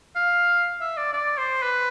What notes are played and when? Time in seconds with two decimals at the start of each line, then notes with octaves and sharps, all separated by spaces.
0.15 F5
0.81 E5
0.97 D5
1.13 D5
1.38 C5
1.63 B4